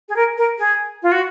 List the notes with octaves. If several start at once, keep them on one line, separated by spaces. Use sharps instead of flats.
G#4
A#4
A#4
G#4
F4
F#4